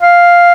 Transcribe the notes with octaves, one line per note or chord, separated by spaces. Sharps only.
F5